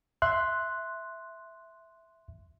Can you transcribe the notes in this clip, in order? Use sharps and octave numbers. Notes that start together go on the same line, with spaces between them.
E5 C6 F#6